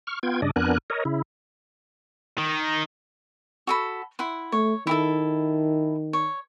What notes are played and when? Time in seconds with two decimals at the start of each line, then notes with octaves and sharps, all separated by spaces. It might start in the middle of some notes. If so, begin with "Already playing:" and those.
0.07 C#6 F6
0.23 B3 F4 G5 G#6
0.42 G2 C#3 D4 D5 D#5
0.56 F2 B3 D4 A#4 G#5 F#6
0.90 A#4 C#5 D#5
1.05 C#3 E4
2.38 D#3
3.67 F#4 A4 B5
4.19 E4 F#5 C6
4.52 A3 C#5
4.87 D#3 E4 G4 A4
6.13 C#5